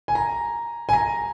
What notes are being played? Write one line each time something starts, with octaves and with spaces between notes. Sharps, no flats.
G#5
A#5
G#5
A#5